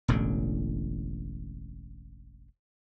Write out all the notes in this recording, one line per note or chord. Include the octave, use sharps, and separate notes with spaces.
E1 A1 A2 D3